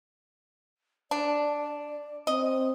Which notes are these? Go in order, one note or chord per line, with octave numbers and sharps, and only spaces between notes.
D4 D5
C4 D#5